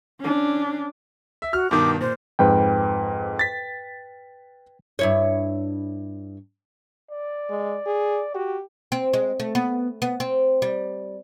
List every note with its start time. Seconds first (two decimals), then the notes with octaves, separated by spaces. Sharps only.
0.20 C#4 D4
1.42 E5
1.53 F#4 F6
1.71 G2 B2 D#3 D6
2.01 A#2 C5
2.39 F2 G#2 B4 G5
3.39 A6 B6
4.99 G2 E4 C#5
7.11 D5
7.50 G#3
7.86 G#4
8.35 F#4 G4
8.92 C4
9.13 G#3
9.40 A3
9.55 B3
10.02 B3
10.20 C4
10.62 G3